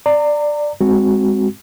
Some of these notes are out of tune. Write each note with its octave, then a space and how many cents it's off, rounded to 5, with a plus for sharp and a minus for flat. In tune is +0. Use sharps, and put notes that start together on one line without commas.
D5 +5 A#5 -30
G#3 -20 C4 +0 F#4 +0